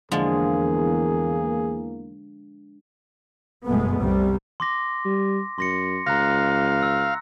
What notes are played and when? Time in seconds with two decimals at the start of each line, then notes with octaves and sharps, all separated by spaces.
0.12 E2 D3 F3 G#3 A#3 G#4
3.66 G1 F#2 B2 G#3 A3 B3
3.96 C2 C3 G3
4.60 C6 D6 A#6
5.05 G3
5.58 F#2 C6 A#6 C#7
6.07 C#2 F5 A#5 F#6 A#6
6.83 E6